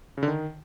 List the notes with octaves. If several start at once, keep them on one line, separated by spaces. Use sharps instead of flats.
C#3
D3
D#3